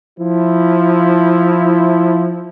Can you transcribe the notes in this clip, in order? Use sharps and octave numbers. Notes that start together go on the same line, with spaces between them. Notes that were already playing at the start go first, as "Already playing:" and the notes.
F3 E4